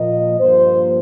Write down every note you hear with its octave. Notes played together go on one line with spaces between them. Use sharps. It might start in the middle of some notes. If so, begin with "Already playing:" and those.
Already playing: A#2 F3 A#3 D#5
G2 F3 A#3 C5